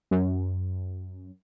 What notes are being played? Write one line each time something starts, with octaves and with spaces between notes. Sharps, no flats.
F#2